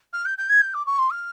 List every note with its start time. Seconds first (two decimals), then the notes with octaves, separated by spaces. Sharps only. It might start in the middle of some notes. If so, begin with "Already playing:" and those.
0.13 F6
0.25 G6
0.38 G6
0.49 G#6
0.61 G6
0.74 D6
0.86 C#6
0.99 C6
1.10 F6